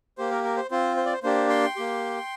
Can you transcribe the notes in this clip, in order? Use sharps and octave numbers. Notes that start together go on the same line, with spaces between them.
A#3 G4 C5
A#4
A#4
C5
C4 F4 C5
C5
D5
C5
A#3 D4 G4 C5
G5 C6
A#3 G4